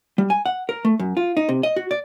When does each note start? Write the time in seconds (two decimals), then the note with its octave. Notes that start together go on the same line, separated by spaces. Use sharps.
0.18 G3
0.30 G#5
0.46 F#5
0.69 A#4
0.85 A3
0.99 F#2
1.17 F4
1.37 D#4
1.49 C3
1.63 D#5
1.76 F#4
1.91 D5